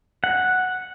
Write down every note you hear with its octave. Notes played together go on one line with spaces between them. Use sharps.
F#5